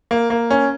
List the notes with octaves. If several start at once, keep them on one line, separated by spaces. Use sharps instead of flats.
A#3
A#3
C#4